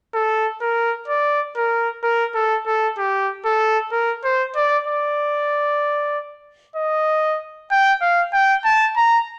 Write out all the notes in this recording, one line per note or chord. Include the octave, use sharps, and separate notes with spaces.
A4
A#4
D5
A#4
A#4
A4
A4
G4
A4
A#4
C5
D5
D5
D#5
G5
F5
G5
A5
A#5